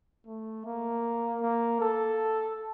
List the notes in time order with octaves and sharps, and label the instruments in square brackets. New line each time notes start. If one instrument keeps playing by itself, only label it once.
[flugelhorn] A3
A#3
A#3
A4